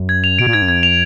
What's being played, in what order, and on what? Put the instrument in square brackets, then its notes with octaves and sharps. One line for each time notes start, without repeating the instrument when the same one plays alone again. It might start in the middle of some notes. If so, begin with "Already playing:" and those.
Already playing: [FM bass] F#2
[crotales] G#6
F7
[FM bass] B2 [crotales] D7
[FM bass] A#2
[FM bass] G#2 [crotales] G#6
[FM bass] F#2
[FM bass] F2 [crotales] G#6
[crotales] F7